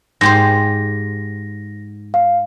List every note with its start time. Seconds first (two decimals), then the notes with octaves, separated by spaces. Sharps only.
0.21 G#2 G4 C5 A#6
2.14 F5